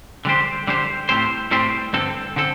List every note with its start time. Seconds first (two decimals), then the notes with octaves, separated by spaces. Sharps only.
0.25 D3 G3 D4 G4 C5
0.67 D3 G3 D4 G4 C5
1.09 A2 G3 C4 G4 C5
1.51 A2 G3 C4 G4 C5
1.93 G2 D3 C4 A4
2.36 D3 C4 A4